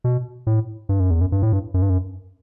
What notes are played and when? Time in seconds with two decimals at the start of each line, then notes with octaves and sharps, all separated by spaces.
0.04 B2
0.47 A2
0.89 G2
1.00 F#2
1.11 E2
1.21 F#2
1.32 G2
1.42 A2
1.53 G2
1.74 F#2
1.82 G2
1.90 F#2